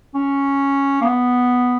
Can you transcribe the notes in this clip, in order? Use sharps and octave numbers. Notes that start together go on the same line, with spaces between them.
C#4
A#3
B3